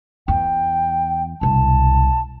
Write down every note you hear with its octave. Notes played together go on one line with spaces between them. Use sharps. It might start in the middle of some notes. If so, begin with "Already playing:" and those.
E2 G5
E1 C2 A5